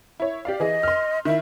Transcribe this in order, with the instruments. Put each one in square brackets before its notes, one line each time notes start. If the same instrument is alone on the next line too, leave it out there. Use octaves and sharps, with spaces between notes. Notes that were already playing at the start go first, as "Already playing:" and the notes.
[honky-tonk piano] E4 C#5
G4 D5 F5
[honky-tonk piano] E3 G#4 [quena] D#5
[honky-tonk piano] C6 F6
[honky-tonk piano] D#3 E4 [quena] E5